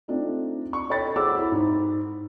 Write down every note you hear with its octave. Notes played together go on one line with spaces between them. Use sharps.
A3 C4 D4 D#4 F4
C#6
A4 C#5 D#5 G5 B5 A6
G#4 A4 C5 F#5 D6 E6
E4 F#4 B5
G#2